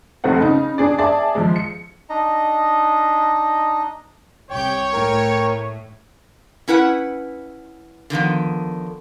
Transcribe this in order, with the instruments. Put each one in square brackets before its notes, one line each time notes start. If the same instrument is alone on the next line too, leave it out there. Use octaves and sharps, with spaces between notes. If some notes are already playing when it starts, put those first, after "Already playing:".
[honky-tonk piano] F1 B1 A3 C4 F#5
C#3 D#4
D4 G#4 D5
G#4 D5 E5 A5
F3 G#3
C#7
[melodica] D4 D#4 D#5 A#5
[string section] C2 G4 G6 [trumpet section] C#5 [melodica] G5
[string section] A2 [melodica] A#4 G5
[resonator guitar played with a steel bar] C#4 E4 B4 F#5
D3 D#3 F3 B3